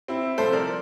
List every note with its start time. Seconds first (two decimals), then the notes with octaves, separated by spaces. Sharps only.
0.08 C4 E4
0.38 C2 C3 F3 A4 C5
0.52 A#4 D5